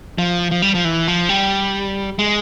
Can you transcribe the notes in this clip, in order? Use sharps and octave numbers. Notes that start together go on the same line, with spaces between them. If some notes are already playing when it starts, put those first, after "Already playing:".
F3
F3
G3
F3
E3
F3
G3
G#3